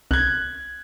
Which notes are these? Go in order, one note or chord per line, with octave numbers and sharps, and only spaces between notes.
C2 F#6 G#6